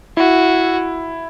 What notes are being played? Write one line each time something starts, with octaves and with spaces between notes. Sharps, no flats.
E4 F#4